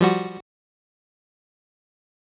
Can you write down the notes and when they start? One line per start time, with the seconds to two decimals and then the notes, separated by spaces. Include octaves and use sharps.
0.01 F3 G3 F#4